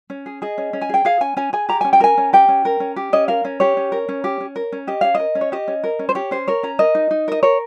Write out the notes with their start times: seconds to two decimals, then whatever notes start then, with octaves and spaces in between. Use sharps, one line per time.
0.10 C#4
0.26 G#4
0.42 G#4 D#5
0.58 C#4
0.73 C#4
0.81 G#5
0.89 G#4 G5
1.05 G#4 F5
1.21 C#4 G#5
1.37 C#4 G#5
1.53 G#4 G#5
1.69 G4 A#5
1.81 C#4 G#5
1.93 G5
2.00 A#4 G#5
2.17 C#4
2.33 G4 G5
2.48 C#4
2.65 A#4
2.80 C#4
2.96 G4
3.13 C#4 D#5
3.28 A#4 F5
3.45 C#4
3.60 G4 C#5
3.77 C#4
3.92 A#4
4.09 C#4
4.24 G4
4.40 C#4
4.56 A#4
4.72 C#4
4.87 G4 D#5
5.01 C#4 F5
5.15 A#4 D#5
5.35 C#4
5.41 C#5
5.52 G4 D#5
5.68 C#4
5.84 A#4
5.99 C#4
6.09 C5
6.15 G4 C#5
6.31 C#4 C5
6.48 A#4 C#5
6.63 C#4 A#5
6.79 A#4 D#5
6.95 D#4
7.11 D#4
7.28 A#4 D#5
7.43 A#4 C#5